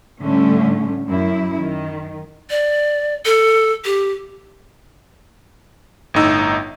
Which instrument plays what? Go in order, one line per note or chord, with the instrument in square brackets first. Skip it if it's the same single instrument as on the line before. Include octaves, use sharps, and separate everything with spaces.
[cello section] A2 D3 G3 A3 C#4
F#2 E4
D#3
[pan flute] D5
A4
G4
[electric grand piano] G1 A2 D#4 E6